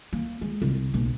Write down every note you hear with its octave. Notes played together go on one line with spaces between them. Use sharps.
A#3
G#3
C2
B1